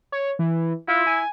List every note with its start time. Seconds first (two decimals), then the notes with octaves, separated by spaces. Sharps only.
0.12 C#5
0.39 E3
0.88 E4 F4
1.07 G#5